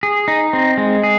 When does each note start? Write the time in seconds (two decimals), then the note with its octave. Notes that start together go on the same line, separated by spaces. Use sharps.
0.03 G#4
0.28 D#4
0.53 C4
0.78 G#3
1.03 G#4